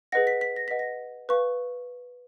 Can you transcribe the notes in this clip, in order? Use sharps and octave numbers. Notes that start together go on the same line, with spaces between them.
G#4 B4 D#5 F#5 A#6
B6
B6
A#6
B4 D#5 F#5 B6
A#6
B4 F5 C#6